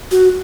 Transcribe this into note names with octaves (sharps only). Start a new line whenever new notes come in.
F#4